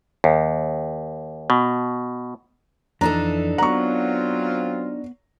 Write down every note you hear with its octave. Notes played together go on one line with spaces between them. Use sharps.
D#2
B2
F2 E3 D4 D#4 A4 A#5
F#3 B3 C4 F4 F#5 A#5 C#6